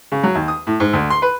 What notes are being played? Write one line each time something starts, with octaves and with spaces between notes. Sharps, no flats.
C#3
F#3
D#2
D#6
A2
G#2
D2
C6
B4